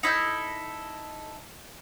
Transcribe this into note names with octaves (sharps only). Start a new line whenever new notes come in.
D#4 E4 A4 G6